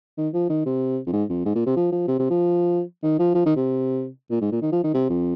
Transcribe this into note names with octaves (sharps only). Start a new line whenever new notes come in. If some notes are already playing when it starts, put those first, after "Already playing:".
D#3
F3
D#3
C3
F2
G#2
F2
G#2
A#2
C3
F3
F3
C3
C3
F3
D#3
F3
F3
D#3
C3
A#2
G#2
A#2
D#3
F3
D#3
C3
F2